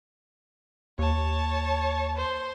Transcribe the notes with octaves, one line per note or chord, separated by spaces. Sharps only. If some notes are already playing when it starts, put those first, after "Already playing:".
D#2 C#5 A5
C5